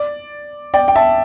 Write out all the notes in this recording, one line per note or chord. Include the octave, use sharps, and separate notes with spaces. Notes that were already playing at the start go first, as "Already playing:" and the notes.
Already playing: D5
D5 G5
G5
E5 A5